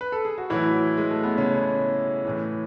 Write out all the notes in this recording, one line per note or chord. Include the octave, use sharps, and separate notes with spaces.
B4
A4
G#4
F#4
A2 E3 F#3 E4
G#3
A3
B3
C#3 C#4
A2 E3